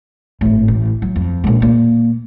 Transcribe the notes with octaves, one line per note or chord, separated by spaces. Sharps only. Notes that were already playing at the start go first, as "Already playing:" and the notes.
G#1 A2
A1
F#3
F2
A#1 G#3
A#2 A#3